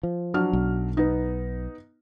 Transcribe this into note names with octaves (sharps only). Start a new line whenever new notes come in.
F3
F#3 D4 F6
B1
B3 D#4